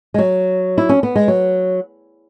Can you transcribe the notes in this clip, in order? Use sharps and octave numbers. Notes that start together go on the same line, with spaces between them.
G#3
F#3
E4
C#4
B3
G#3
F#3